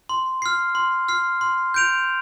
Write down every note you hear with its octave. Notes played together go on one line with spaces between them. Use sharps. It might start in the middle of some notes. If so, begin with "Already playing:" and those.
C6
F6 C7
C6
F6 C7
C6
G6 D7 F7